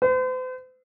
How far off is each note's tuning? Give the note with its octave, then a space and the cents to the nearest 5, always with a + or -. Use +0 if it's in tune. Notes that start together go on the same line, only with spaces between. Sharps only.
C5 -45